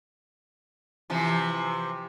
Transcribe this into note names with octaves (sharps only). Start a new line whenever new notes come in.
C3 E3 F3